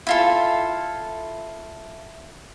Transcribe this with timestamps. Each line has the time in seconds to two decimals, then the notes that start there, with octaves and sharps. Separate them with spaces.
0.07 E4 F4 A4